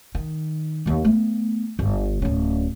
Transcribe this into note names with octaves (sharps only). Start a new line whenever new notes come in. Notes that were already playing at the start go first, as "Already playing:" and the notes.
D#3
D#2 D#3
A3 B3
G1 D3
D1 C#4